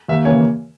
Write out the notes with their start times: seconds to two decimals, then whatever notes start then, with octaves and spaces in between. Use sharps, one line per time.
0.08 D#2 E5
0.24 C#3 E3 A#3 C#5